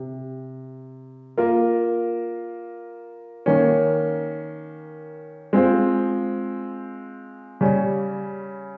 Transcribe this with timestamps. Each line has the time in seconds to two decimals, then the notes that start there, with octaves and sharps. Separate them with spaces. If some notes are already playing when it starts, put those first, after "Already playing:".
Already playing: C3
1.37 A#3 F4 A#4
3.46 D#3 A#3 C#4
5.53 G#3 C4 F4 C5
7.61 C#3 G3 C#4